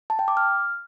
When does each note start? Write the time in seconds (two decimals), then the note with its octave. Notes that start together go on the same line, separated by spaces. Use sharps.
0.10 A5
0.19 G5
0.28 D6
0.37 F6